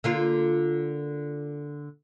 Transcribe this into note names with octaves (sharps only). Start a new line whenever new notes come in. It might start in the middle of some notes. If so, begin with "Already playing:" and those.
D3 A#3 F4